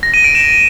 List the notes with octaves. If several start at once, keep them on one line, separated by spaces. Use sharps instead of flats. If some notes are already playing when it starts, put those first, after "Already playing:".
A#6
D#7
D7
E7